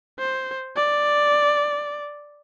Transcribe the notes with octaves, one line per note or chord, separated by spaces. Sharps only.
C5
D5